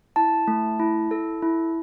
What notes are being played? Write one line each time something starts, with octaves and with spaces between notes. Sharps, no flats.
E4 A5
A3
E4
A4
E4